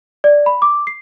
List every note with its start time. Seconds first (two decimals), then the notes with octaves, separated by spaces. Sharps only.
0.24 D5
0.46 B5
0.62 D6
0.87 C7